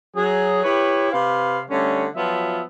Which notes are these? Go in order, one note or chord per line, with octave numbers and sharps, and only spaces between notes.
F#3 G#4
E4 G4 B4 C#5
C3 B4 F5
D3 G3 A3 C#4
F3 F#3 B3 F4 E5